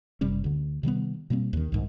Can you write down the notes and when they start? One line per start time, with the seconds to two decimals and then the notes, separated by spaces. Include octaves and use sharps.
0.21 F#1 C3 G3 C#4
0.44 D2 D3
0.83 C3 D#3 G3 B3
1.30 B2 G3 A#3 C4
1.53 D#2 D#3
1.72 C2 G#2 D#3